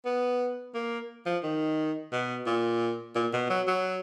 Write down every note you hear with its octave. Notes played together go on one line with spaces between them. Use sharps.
B3
A#3
F3
D#3
B2
A#2
A#2
B2
F#3
F#3